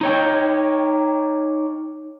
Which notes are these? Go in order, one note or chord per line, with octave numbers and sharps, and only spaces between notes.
D#4 C#5 G5